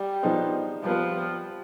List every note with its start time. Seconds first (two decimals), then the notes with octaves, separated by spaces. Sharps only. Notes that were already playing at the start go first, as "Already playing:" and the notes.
Already playing: G3
0.23 F3 B3 D#4 G#4 C5
0.84 F3 G3 B3 F4 B4